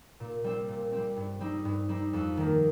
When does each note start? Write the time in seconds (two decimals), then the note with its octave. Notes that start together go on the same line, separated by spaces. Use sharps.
0.20 A#2
0.44 G3 C4
0.69 A#2
0.93 G3 C4
1.16 G2
1.40 G3 C4 D#4
1.65 G2
1.89 G3 C4 D#4
2.13 F2
2.37 D#3 A#3